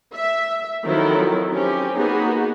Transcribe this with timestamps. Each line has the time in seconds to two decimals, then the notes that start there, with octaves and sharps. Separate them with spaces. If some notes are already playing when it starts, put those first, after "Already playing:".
0.14 E5
0.84 D#3 F3 F#3 C4 E4 A4
1.51 C4 C#4 G4
1.97 A#3 B3 D#4 F#4 G#4